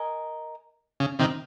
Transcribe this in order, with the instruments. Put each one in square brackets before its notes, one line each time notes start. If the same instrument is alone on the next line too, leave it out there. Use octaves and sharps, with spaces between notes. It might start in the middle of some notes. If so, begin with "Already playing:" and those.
Already playing: [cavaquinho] A#4 D#5 G#5
[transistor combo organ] C#3
C3 D#3